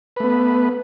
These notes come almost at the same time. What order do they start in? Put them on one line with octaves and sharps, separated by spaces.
B4 A3 B3